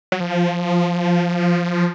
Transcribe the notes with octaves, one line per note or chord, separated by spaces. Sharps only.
F#3
F3